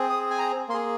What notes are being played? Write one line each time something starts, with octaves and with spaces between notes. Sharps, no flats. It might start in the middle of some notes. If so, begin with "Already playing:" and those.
Already playing: C4 G#4
D#6
G#5
A#5
A#3 G#4 C6